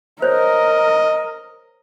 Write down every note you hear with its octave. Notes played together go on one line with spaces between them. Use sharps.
A#4 C5 C#5 D#5